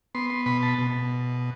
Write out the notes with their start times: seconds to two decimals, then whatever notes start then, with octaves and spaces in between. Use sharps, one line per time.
0.15 B3 C6
0.30 C6
0.46 B2 B5
0.62 A5
0.78 B2